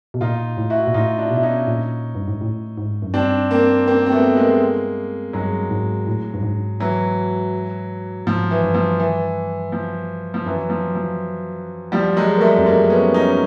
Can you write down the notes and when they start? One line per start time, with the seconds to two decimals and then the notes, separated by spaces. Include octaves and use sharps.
0.14 B2
0.21 A#2 D#4 F4
0.57 A2
0.70 E4 F#4
0.87 A#2
0.94 A2 D#4 F4
1.18 D4 E4
1.31 B2
1.36 E4
1.43 C#4 D#4
1.67 A#2
2.15 G2
2.27 G#2
2.41 A2
2.78 G#2
3.02 F#2
3.14 G2 C4 D4
3.51 A#3 C4
3.87 A#3 C4
4.06 C4
4.11 A3 B3
4.36 G#3 A#3
5.33 G2 F#3 G#3
5.70 G#2
6.07 A2
6.34 G2
6.43 G#2
6.80 E3 F#3
8.26 G#2 F3
8.51 E3
8.63 G2
8.74 F3
9.00 E3
9.72 F3
10.34 F3
10.46 F#2 E3 F#3
10.70 F3
10.95 F3
11.92 F3 G3
12.16 F#3 G#3
12.36 A#3
12.40 G3 A3
12.58 F2
12.66 F#2 G#3 A#3
12.90 B3 C#4
13.14 C#4 D#4